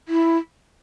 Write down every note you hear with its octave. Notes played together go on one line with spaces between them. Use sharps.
E4